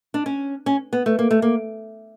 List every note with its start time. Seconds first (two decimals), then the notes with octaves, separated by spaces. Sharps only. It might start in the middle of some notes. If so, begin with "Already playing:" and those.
0.14 D4
0.26 C#4
0.66 C#4
0.93 B3
1.06 A3
1.19 A#3
1.31 A3
1.42 A#3